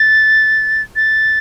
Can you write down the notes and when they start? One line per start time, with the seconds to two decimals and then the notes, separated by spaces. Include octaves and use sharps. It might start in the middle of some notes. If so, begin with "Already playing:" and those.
Already playing: A6
0.96 A6